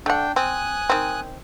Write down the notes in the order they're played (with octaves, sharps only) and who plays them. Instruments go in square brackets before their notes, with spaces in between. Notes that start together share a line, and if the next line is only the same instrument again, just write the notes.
[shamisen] A3 F#5 [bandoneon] D4 G5
[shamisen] C4 [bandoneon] G#5 D#6 F#6
[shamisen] D#3 C4